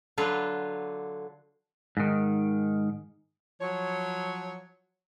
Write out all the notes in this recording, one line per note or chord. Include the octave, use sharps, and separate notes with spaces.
D3 F#3 F4 B4
G#2 D#3
F3 F#3 C#5